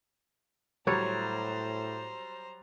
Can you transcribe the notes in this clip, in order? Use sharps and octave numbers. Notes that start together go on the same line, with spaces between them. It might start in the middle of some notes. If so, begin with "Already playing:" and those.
A2 F#3 G3 C5 C#5 A#5